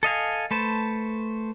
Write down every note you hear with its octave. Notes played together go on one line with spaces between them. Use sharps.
A4 D#5 F5 G#5
A3 B4 C5 A5